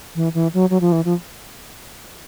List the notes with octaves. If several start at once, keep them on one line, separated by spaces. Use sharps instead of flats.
E3
E3
F#3
F#3
F3
E3
F3